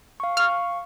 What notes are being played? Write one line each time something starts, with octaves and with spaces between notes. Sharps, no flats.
F5 C#6
F5 C#6 F6